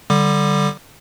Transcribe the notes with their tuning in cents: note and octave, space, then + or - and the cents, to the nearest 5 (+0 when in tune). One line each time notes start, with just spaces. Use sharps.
D3 +0 G3 -10 D6 +30